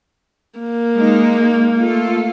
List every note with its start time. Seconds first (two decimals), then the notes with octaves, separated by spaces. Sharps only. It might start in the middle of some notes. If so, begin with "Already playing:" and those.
0.59 A#3
0.96 G#3 D#4
1.79 A3 F4 A4